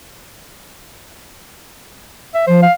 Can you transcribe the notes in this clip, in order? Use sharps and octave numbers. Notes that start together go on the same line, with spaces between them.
E5
F3 C5
F5